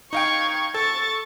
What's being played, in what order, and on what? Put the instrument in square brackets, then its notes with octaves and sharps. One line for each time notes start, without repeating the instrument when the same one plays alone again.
[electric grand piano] D#4 F5 G5 [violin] C#6 G#6
[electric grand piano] A4 [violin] C#6 A6